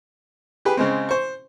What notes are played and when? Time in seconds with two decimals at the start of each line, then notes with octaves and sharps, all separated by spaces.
0.65 G4 G#4 B4
0.77 C#3 G#3 C4
1.09 C5 C#6